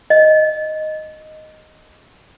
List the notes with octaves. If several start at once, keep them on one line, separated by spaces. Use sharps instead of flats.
D#5